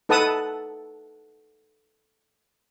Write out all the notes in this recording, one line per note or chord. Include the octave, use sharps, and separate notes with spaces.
D#4 A4 B4 F#5 A5 D#6